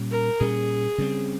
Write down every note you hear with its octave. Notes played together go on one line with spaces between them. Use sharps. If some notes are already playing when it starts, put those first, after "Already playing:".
Already playing: A#2 G3 C#4
A#4
A#2 G3 C#4 G#4
C#3 G3 C4